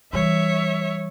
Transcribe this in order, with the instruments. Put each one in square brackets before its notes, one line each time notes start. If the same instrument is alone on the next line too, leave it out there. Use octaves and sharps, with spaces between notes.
[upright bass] E3 G3 [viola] C#5 E5